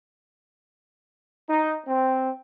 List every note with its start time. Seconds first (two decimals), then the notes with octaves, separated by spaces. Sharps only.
1.49 D#4
1.86 C4